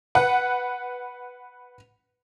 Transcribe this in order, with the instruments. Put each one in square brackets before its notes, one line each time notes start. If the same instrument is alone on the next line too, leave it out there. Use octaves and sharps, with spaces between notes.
[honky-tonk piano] B4 F#5